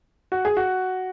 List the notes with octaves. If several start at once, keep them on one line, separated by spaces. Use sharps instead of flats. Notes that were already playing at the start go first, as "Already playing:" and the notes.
F#4
G#4
F#4